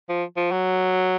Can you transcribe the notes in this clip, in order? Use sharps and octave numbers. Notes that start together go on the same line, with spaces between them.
F3
F3
F#3